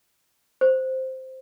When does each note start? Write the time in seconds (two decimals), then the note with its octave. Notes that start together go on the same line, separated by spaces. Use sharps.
0.61 C5